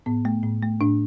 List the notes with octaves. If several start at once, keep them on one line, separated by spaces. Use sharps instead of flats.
A2 B3
A3
A2
A3
A2 D4